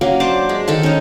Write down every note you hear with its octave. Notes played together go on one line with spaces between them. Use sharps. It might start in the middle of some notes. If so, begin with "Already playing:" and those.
F#3 A#3 C#4
D4 C5 A5 D6
G#3
D#3 A4 A5
C#4 D#4